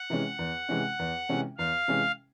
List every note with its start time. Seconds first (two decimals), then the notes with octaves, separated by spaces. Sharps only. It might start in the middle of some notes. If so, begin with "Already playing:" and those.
Already playing: F#5
0.10 C3 E3 G#3 C#4
0.39 E2
0.69 C3 E3 G#3 C#4
0.99 E2
1.29 C3 E3 G#3 C#4
1.58 E2 F5
1.88 C3 E3 G#3 C#4